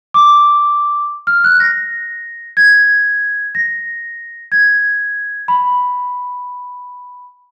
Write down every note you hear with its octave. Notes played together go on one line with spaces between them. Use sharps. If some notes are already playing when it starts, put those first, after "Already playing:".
D6
F6
F#6
A#6
G#6
A#6
G#6
B5